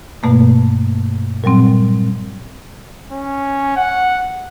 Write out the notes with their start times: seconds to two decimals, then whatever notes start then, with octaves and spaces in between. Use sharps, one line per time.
0.23 G2 B2 A3 A#3
1.44 A#2 F#3 G3 C4
3.12 C#4
3.76 F#5